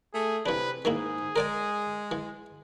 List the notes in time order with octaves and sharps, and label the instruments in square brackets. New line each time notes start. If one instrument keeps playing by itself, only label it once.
[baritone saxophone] A3 [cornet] G#4
[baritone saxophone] C3 [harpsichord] E3 D4 [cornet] B4
[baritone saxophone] G#2 [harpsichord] D#3 A#3 E4 [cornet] G#4
[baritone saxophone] G#3 [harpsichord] A#4 D5 G#5
[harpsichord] E3